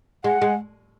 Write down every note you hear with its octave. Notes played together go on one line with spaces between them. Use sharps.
G#3 F#5
G#3